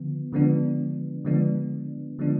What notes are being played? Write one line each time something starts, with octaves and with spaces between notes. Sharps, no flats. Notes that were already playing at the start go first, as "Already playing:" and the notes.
Already playing: D3 F3 B3
D3 F3 G#3 B3 D4
D3 F3 G#3 B3 D4
D3 F3 G#3 B3 D4